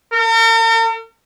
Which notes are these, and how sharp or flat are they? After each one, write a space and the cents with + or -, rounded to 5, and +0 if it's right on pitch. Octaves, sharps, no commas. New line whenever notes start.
A#4 -45